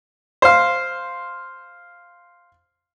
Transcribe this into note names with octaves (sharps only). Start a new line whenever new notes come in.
C5 F5